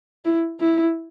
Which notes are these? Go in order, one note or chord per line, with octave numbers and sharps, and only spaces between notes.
E4
E4